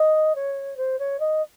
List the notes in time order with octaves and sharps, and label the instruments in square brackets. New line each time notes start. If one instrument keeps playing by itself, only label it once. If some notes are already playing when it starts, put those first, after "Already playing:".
Already playing: [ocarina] D#5
C#5
C5
C#5
D#5